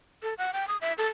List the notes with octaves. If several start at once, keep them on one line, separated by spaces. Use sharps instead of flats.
A4
F#5
G5
D#6
E5
A4